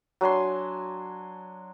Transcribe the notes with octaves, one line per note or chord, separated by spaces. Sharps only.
F#3 D4 G#5 C6